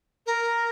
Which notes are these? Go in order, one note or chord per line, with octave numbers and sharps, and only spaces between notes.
A#4